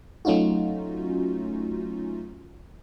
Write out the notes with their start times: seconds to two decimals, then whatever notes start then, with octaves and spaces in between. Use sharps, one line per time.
0.25 F#3 A3 C#4 D#4 F4 F#4